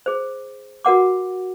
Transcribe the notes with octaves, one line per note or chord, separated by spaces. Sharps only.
G#4 C5
F#4 A#4 F#5 D6